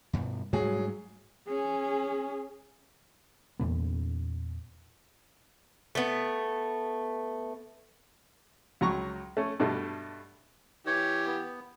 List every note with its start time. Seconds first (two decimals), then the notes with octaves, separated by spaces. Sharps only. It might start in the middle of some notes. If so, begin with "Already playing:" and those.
0.13 G2 B2
0.53 G#2 F#3 G3 A3 G#4
1.48 C#4 G#4
3.59 E2 A#2 B3
5.95 A3 B3
8.81 C#2 F#3 A#5 C#6
9.37 A3 C#4
9.60 G2 B2 A3
10.87 E3 G4 C#5
11.27 B3